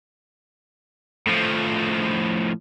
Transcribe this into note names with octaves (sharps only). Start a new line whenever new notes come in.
A2 F3